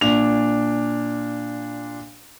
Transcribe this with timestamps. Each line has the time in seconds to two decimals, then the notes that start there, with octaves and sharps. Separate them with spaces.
0.01 A#2 D4 F7